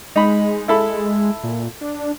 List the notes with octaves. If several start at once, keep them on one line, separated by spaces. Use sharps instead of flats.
G#3 D#4 B5
E4 A4 B5
A#2
D4